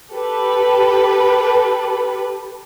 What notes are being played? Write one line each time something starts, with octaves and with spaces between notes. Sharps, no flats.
G4 A4 B4